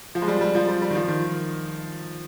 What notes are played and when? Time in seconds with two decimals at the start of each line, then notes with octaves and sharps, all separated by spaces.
0.15 F3
0.22 G#3
0.28 G3
0.41 G3
0.55 F3
0.68 G3
0.82 G3
0.90 D#3
0.95 F3
1.08 D#3